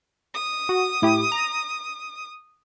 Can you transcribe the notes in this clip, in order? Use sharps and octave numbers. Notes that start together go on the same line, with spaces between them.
D#6
F#4
A2 E4 G4
A#5